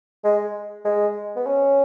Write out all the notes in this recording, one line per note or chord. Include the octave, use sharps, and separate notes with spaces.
G#3
G#3
B3
C#4